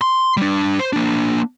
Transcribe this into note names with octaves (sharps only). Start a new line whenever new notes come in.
C6
G3 D4
C5
A#3 D4